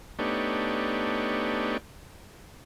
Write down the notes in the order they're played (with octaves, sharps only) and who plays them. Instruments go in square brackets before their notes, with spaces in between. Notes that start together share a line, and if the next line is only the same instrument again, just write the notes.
[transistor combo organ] A3 B3 D4 D#4 G4 C#5